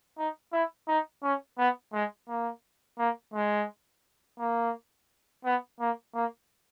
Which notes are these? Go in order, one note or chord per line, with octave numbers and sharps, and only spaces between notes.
D#4
E4
D#4
C#4
B3
G#3
A#3
A#3
G#3
A#3
B3
A#3
A#3